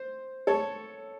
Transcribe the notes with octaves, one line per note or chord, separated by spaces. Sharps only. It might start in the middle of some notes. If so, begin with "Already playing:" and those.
Already playing: C5
A4 C#5